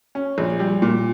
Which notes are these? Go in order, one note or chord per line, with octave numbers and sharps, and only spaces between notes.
C#4
A#1
G3
A#2